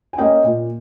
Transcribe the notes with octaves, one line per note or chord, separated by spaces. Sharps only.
G#5
A#3 C#4 D#5 G5
A#2